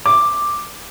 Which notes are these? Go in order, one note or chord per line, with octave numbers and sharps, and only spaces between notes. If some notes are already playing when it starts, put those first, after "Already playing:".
D6